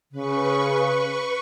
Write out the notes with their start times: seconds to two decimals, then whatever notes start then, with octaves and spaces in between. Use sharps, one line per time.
0.12 C#3 B4 C#6